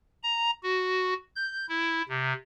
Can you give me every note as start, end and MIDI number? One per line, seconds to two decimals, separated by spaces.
0.23 0.50 82
0.63 1.14 66
1.35 1.66 91
1.69 2.02 64
2.09 2.33 48